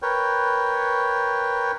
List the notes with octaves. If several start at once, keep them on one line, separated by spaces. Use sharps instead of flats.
A#4 B4 C#5 G5